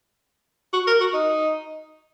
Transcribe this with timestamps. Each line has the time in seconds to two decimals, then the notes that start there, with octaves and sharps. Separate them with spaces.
0.73 F#4
0.87 A#4
1.00 F#4
1.14 D#4